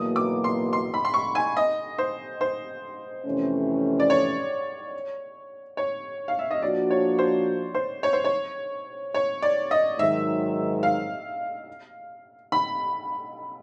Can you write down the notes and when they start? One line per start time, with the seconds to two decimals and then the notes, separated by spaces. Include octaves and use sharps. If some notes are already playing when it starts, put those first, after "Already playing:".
Already playing: E2 B2 F#3 A#3 D#6
0.16 D6
0.44 C6
0.73 C6
0.94 B5
1.05 C6
1.14 C#6
1.35 G#5
1.57 D#5
1.98 C5
2.41 C5
3.25 F2 C3 E3 A3 C#4
4.00 D5
4.10 C#5
5.77 C#5
6.28 F5
6.39 E5
6.51 D#5
6.62 F3 A#3 D4 F#4 D5
6.90 C#5
7.19 C5
7.74 C5
8.03 C#5
8.13 C5
8.24 C#5
9.14 C#5
9.42 D5
9.71 D#5
9.99 G#2 D#3 F#3 E5
10.83 F5
12.52 B5